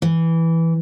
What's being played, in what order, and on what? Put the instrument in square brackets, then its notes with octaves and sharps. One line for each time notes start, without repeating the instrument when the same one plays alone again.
[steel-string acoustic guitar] E3